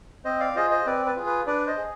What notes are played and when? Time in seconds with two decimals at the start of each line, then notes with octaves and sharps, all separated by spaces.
0.25 C4 C5 D#5
0.40 D5 F5
0.55 F4 G#4 C5 D#5
0.70 C5 D#5
0.86 C4 B4 D5
1.06 B4
1.17 F4 G#4
1.26 B4
1.47 D4 B4 D5
1.67 C5 D#5
1.77 G#4